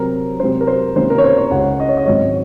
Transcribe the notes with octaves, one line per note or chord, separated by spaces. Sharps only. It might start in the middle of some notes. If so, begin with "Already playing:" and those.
Already playing: C3 F#3 C4 A#4
C3 F#3 C4 C5
A#4
C5
C3 D#3 A#3 C#4 C5
A#4
C#5
C5
C#5
C#2 C#3 G#3 F#5
D#5
C#5
D#5
G#2 D#3 F#3 C4 C#5